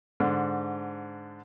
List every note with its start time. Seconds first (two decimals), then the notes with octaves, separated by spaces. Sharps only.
0.20 G#2 D3